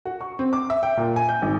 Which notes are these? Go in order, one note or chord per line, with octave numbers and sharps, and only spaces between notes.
F#4
C#6
C4
D6
E5
G5
A#2
G#5
G6
G#1